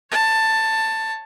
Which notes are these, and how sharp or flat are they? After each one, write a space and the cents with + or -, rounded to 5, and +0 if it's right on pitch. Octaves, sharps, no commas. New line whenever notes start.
C#5 +0 A5 +10